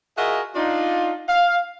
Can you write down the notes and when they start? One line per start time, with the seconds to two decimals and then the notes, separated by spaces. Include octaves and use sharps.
0.18 F4 F#4 G#4 A#4 D#5 E5
0.55 D4 D#4 F4
1.29 F5